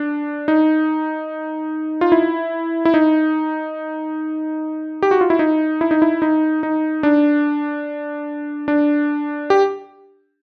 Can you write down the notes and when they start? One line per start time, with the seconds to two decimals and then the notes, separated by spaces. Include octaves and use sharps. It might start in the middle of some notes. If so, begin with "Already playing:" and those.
Already playing: D4
0.48 D#4
2.01 F4
2.12 E4
2.85 E4
2.94 D#4
5.02 G4
5.11 F#4
5.21 F4
5.30 E4
5.39 D#4
5.81 E4
5.91 D#4
6.02 E4
6.22 D#4
6.63 D#4
7.03 D4
8.68 D4
9.50 G4